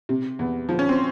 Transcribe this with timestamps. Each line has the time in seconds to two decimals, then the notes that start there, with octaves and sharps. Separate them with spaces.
0.09 C3
0.39 E2
0.69 F3
0.79 C#4
0.89 C4